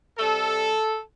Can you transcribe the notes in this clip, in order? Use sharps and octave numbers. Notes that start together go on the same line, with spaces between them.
C3 G3 A4